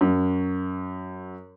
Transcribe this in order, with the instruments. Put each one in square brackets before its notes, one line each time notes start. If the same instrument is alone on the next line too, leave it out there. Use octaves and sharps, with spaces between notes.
[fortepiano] F#2